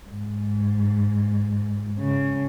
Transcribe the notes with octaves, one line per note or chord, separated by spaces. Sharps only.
G#2
C#3